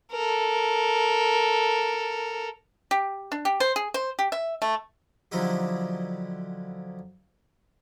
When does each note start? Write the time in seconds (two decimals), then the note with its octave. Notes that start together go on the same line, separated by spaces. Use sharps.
0.12 A4 A#4
2.91 G4
3.32 D4
3.45 G4
3.60 C5
3.76 G#4
3.94 C5
4.19 G4
4.32 E5
4.62 A3
5.32 D3 F3 F#3 D#4 E4 G4